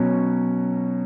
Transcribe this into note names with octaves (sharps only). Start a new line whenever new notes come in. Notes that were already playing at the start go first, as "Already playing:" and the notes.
Already playing: B2 F#3 C#4